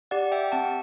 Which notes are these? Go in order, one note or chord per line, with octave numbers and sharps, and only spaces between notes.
G4 D5 F#5
E5 G5
C4 F#5 A5